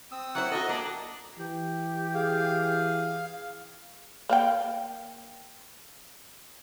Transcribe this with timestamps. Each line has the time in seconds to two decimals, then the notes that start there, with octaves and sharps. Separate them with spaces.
0.12 C4 D#6 E6
0.35 F#3 E4 C5 F#5
0.52 F#4 A4 D#5
0.69 A#3 D4 A5
1.38 E3 G4
2.15 G#4 F5
4.29 A#3 F5 G5